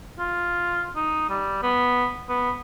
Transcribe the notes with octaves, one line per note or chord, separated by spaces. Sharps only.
F4
D#4
G3
B3
B3